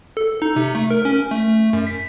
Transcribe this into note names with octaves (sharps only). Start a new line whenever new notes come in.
A4
D#4
C3
A3
A#4
C#4
A3
F#2
B6